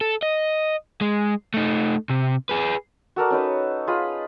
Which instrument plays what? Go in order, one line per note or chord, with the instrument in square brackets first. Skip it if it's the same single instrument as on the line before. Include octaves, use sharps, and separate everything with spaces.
[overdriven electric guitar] A4
D#5
G#3
A3 D#4
C3
G#4 B4
[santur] F#4 A4 A#4 D5
C#4 D#4 B4
F4 G#4 D#5 B5